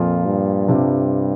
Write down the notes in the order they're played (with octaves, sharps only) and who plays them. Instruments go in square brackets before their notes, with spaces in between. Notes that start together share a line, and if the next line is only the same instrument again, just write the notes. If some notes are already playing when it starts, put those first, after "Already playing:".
Already playing: [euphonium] F2 [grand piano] A#2 F3 A#3 F4
[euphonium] G2
[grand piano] C3 G3 D4 F4